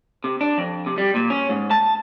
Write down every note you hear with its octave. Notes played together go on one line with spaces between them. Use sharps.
C3
D4
F2
C3
G3
A#2
C#4
G#2
A5